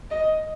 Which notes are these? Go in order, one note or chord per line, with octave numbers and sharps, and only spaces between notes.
D#5